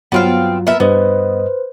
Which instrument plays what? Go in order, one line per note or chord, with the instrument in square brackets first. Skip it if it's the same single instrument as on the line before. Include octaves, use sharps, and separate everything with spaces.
[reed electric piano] G2 F#3 F4 [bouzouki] B3 C4 F5
[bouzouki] B3 A#4 E5
[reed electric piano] G2 D#5 [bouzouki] B3 [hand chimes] B4 C5